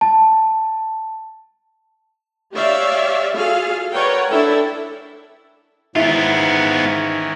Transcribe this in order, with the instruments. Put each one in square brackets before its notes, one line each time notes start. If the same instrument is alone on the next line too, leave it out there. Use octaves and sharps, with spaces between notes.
[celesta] A5
[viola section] G4 C#5 D5 E5 F5
F4 F#4 G#4 A4 F5
A#4 B4 C#5 D5 F#5 G5
C#4 D4 E4 A4 E5 G5
[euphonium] G#2 [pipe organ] D#3 E3 C#4 [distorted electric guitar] B3 F4 [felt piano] E4